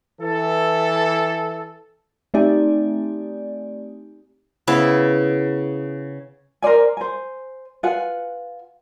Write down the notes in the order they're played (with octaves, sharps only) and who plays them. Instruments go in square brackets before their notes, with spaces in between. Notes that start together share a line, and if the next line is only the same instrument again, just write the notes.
[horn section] E3 A4
[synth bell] A3 C4 D#4 G4 D5 G#5
[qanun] C#3 B3 E4
[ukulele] A#4 C5 D5 G#5
C5 G#5
F4 B4 F#5 G#5